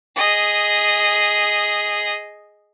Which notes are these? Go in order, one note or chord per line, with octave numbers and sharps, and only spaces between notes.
G#4 D#5